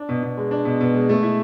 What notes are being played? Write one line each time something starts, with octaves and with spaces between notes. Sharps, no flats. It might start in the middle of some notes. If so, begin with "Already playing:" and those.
Already playing: D4
B2
B2
G#3
D4
B2
B2
G#3
A3
E4